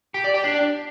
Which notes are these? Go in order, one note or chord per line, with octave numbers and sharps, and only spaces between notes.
G4
D5
G4
D4